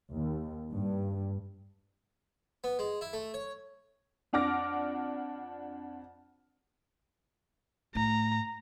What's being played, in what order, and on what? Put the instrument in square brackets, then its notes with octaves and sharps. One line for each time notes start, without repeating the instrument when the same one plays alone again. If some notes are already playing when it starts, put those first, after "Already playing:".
[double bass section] D#2
G2
[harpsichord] B3
G#3
E4
A3
C#5
[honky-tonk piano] F2 D4 F#5 D6 F6 A#6
[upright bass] A2 [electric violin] A#5